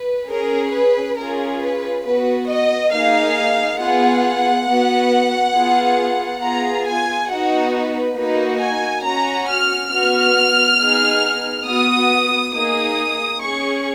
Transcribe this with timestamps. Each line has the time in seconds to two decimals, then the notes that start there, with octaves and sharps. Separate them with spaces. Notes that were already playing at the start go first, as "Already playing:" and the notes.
Already playing: B4
0.30 C#4 G#4 A#4
0.74 B4
1.18 C#4 F4 G#4 A#4
1.61 B4
2.05 B3 F#4 B4
2.49 D#5
2.93 A#3 D#4 G#4 F5
3.80 B3 F4 G#4 F#5
4.67 B3 F#4
5.54 B3 F4 G#4
6.41 B3 F4 G#4 A#5
6.86 G#5
7.30 B3 D#4 F#4 F#5
7.73 B4
8.17 A#3 D#4 F#4 B4
8.61 G#5
9.04 C#4 F#4 A#5
9.48 F6
9.91 B3 F#4 F6
10.79 B3 D#4 G#4
11.66 B3 F#4 D#6
12.53 A#3 D#4 G#4 D#6
13.40 C#4 G#4 C#6